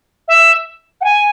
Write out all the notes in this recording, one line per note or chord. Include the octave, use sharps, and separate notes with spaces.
E5
F#5
G#5